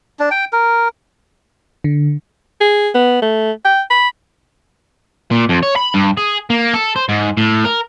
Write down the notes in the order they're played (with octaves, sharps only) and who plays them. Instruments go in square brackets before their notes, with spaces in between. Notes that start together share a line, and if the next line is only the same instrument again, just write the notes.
[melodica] D4
G5
A#4
[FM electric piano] D3
[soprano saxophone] G#4
B3
A3
G5
B5
[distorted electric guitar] A#2
F2
C#5
B5
G2
G#4
A#3
A4
C5
G#2
A2
A#4